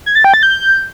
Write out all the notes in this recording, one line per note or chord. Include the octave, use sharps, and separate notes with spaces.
G#6
A6
G5
A6
G6